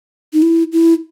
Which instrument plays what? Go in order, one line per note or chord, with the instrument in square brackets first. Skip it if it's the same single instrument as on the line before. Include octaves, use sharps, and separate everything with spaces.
[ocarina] D#4
E4
E4